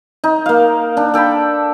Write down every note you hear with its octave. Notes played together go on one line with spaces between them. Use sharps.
D#4
A#3 F5
D4
A4 G5 A5 B5